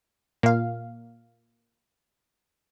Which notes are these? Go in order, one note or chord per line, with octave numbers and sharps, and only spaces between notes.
A#2 A#3 F5